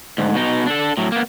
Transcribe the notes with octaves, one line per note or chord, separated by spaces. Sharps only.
D2 G#2
B2 D#4
D4 A4
A2 F#3
A#3 B3